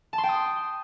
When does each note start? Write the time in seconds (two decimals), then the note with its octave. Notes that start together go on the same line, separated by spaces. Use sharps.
0.13 A5
0.18 C6
0.23 G5
0.29 D#6